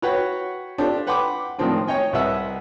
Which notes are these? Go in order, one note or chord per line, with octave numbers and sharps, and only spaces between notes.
F#4 B4 C#5 F#5 G5
D4 F4 G4 A4 C5 G5
B4 F#5 G5 B5 C6 D6
A2 D#3 F3 G#3 C4 D4
C#5 D#5 G5 G#5
C2 B4 D#5 E5 F#5 E6